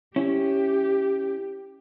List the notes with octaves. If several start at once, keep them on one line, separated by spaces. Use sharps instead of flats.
C#4 E4 G4